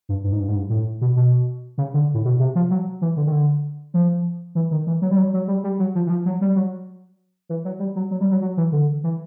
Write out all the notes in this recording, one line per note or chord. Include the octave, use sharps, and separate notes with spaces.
G2
G2
G#2
G2
G#2
G2
A2
B2
B2
C#3
D3
A2
B2
C3
F3
F#3
E3
D3
D#3
D3
F3
E3
D#3
E3
F#3
G3
F#3
F#3
G3
G3
F#3
F3
E3
F3
F#3
G3
F#3
E3
F#3
G3
F#3
F#3
G3
F#3
F#3
E3
D3
E3